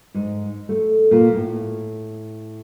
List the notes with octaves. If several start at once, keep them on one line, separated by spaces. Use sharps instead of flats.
G#2
A3
A#2
A2